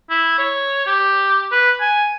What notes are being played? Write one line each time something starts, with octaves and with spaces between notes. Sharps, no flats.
E4
C#5
G4
B4
G#5